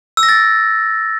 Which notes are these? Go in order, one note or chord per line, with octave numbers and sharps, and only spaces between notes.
E6
A#6
A6